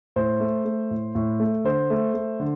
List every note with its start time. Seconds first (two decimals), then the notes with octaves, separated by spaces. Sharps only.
0.16 A2 C5
0.40 A3
0.65 A3
0.91 A2
1.15 A2
1.40 A3
1.64 D3 C5
1.90 A3
2.14 A3
2.40 D3